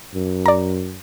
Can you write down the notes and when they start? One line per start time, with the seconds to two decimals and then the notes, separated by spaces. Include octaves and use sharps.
0.15 F#2
0.46 D5 A#5